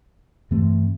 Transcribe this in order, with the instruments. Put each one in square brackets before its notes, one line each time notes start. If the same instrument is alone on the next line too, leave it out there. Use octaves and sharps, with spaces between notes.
[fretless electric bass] G2 E3 A3 C4